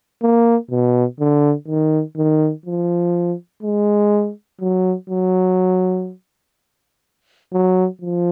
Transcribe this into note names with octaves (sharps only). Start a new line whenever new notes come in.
A#3
B2
D3
D#3
D#3
F3
G#3
F#3
F#3
F#3
F3